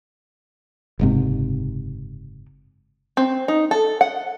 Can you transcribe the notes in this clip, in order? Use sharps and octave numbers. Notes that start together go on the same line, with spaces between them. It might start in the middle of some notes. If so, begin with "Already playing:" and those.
F#1 G#2 C3
C4
D#4
A4
F#5